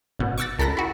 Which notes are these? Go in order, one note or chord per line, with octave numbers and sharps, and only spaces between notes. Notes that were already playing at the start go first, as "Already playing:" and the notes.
G#1 B2
C#6 D6 E6 F#6 A6
C#2 A4 A#4 B5 F#6 A#6
E4 F#4